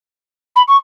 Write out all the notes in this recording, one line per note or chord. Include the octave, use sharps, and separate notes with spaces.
B5
C#6